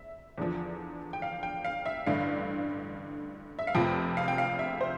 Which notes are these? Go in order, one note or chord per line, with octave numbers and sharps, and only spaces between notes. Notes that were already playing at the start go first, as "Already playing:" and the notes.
Already playing: E5
E2 D3 F3
G5
F5
G5
F5
E5
A1 G2 D3 F5
E5
F5
F1 F2 C3 F3 G5
F5
G5
F5
E5
C5